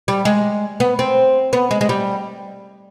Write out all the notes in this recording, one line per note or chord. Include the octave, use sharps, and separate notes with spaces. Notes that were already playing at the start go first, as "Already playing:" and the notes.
G3
G#3
B3
C4
B3
G#3
G#3
G3